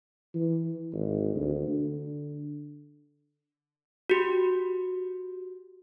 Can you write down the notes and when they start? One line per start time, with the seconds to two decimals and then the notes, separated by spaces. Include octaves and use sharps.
0.34 E3
0.93 G#1
1.35 D2
1.68 D3
4.10 F#4 G4